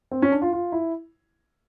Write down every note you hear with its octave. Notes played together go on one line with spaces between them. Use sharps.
C4
C#4
D4
F4
F4
E4